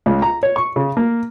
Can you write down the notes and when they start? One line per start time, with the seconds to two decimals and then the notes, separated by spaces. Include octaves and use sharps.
0.06 C#2
0.22 A#5
0.43 C#5
0.56 C#6
0.76 C#3
0.97 A#3